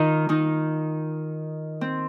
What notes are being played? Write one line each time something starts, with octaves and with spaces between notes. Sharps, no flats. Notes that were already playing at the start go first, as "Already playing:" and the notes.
Already playing: D#3 D#4 F4
D#3 D#4
C4